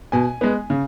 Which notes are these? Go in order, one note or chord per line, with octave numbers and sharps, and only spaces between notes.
B2 G#5
G#3 B3
C#3